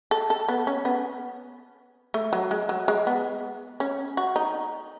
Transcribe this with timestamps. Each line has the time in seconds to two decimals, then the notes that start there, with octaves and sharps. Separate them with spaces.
0.11 A4
0.30 A4
0.48 B3
0.67 C#4
0.85 B3
2.14 A3
2.33 F#3
2.51 G#3
2.69 F#3
2.88 G#3
3.07 B3
3.80 C#4
4.17 F#4
4.36 D#4